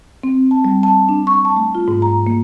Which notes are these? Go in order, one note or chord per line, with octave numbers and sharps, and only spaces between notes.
C4
A5
G3
A5
D4
C#6
A5
A3
F4
G#2
A#5
A#3